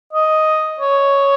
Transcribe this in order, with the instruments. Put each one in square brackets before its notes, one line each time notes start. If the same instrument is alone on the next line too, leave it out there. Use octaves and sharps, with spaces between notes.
[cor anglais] D#5
C#5